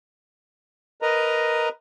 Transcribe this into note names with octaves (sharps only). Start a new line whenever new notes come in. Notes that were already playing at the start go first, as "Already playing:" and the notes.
A#4 B4 D#5 A#5